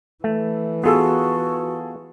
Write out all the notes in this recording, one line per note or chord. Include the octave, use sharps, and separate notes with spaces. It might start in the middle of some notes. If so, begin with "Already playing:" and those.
E3 A3
B3 F4 F#4 G#4 A4 E6